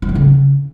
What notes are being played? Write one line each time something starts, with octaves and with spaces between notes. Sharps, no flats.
F3
A3
C#3